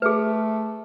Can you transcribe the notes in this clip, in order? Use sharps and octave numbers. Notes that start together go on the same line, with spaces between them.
A3 G#4 B4